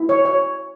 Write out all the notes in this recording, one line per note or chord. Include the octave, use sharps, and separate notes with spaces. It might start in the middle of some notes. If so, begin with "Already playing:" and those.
Already playing: E4
C#5
C#5